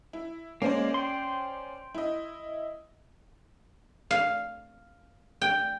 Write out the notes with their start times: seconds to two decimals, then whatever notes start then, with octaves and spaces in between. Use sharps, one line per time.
0.13 E4
0.62 G#3 A#3 C#4 C5 D5
0.94 G5 C6
1.95 E4 D#5
4.11 F5
5.42 G5